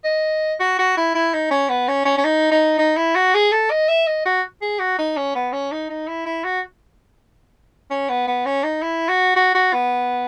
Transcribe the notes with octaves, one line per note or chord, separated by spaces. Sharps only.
D#5
F#4
F#4
E4
E4
D#4
C#4
B3
C#4
C#4
C#4
D#4
D#4
D#4
E4
F#4
G#4
A4
D#5
E5
D#5
F#4
G#4
F#4
D#4
C#4
B3
C#4
D#4
D#4
E4
E4
F#4
C#4
B3
B3
C#4
D#4
E4
F#4
F#4
F#4
B3